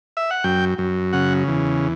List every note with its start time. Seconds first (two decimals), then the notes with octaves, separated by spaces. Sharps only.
0.17 E5
0.31 F#5
0.44 F#2 G5
0.78 F#2
1.13 C#3 F#5
1.48 E2